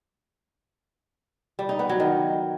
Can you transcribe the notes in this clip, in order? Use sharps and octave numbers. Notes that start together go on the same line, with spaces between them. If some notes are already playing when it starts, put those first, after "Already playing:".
G3
D#4
B3
F#3
D#3